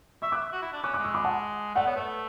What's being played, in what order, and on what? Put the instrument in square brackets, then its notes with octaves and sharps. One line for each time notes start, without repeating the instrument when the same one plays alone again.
[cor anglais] E5 [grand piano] C#6 E6
[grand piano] D6 F#6
[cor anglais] E5
F#4
E4
D4
[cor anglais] C#4 [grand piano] D6 F#6
[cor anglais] G#3 [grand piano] D6 F#6
[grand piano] C#6 E6
B5 D6
F#5 A5
[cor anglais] A3 [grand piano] D5 F#5
[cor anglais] B3 [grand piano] C#5
[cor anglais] A3 [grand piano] B4